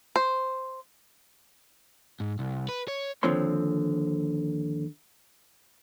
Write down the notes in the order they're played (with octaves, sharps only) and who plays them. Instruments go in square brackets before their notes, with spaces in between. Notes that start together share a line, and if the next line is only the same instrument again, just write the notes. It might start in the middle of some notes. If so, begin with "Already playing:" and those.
[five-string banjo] C5
[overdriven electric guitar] G#2
C2
B4
C#5
[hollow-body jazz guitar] D#2 D3 F3 C4 C#5 C6